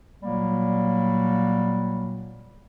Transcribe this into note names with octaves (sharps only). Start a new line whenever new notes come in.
A#2 F#3 G3 A#3